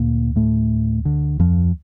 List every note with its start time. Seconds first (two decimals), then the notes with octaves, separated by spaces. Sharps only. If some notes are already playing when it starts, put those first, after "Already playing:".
Already playing: D2 A#2 A#3
0.36 A2 A3
1.05 D3
1.39 F2 F3